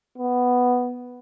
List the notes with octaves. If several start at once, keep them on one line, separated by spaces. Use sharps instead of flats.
B3